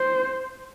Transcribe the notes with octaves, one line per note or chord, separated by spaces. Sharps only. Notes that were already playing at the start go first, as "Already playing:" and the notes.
Already playing: C5